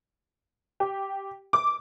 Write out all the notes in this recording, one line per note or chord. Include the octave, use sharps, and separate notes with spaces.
G4
D6